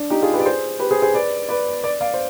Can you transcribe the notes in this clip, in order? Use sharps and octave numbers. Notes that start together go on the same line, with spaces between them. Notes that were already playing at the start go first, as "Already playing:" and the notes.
Already playing: D4
D#4 G4
F4 G#4
G4 B4
D5
G#4 C5
G4 B4
G#4 C5
G#4 C5
B4 D5
B4 D5
B4 D5
D5 F5
C5